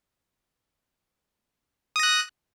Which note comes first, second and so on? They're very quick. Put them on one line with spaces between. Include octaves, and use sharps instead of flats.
D#6 A#6 F#6